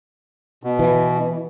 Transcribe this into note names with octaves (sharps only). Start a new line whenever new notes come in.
B2
E3